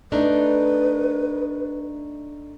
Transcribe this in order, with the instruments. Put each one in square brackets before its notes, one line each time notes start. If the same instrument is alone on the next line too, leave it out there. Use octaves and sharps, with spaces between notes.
[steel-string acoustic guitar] A3 D4 D#4 [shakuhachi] B4